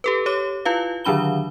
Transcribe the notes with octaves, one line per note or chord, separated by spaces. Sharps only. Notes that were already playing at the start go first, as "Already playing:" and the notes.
G4 A4 B4
G4 C#5 D6
E4 F4 B4 F5
D3 D#3 F#3 D4 B5 G7